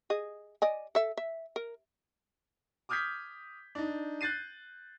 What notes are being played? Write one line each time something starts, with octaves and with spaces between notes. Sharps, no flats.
G#4 D#5
D5 D#5 G#5
A4 E5
E5
A#4
D6 D#6 F6 G6 G#6 B6
D4 D#4
F#6 G6 A6 C7 D#7